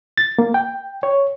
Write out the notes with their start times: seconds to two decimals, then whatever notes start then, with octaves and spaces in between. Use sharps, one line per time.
0.18 A6
0.39 A#3
0.54 G5
1.03 C#5